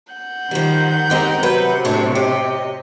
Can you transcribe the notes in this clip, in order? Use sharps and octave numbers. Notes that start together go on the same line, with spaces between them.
F#5 G6
D#3 F3 G3
G#3 C4 D#4 G4 A#4
C3 F#3 B4
A2 F#3 G#3 A3 D4 C#5
G4 C#5 D#5